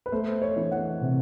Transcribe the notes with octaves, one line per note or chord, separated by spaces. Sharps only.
B4
A3 C5
C#5
E3
F#5
C3